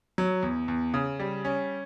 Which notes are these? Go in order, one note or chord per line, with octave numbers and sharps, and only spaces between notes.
F#3
E2
E2
C#3
G3
C#4